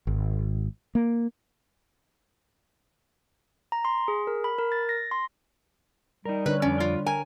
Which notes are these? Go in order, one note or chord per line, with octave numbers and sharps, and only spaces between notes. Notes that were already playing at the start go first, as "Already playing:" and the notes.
G#1
A#3
A#5
C6
G#4
A#4
B5
A#4
A6
A#6
C6
G3 D#4 A#4
D3 D4 B4 C#5
F2 C#4 D5
F4
A#4 G#5